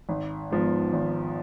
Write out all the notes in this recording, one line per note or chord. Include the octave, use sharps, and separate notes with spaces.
G#1
G#2 F3 B3
G#1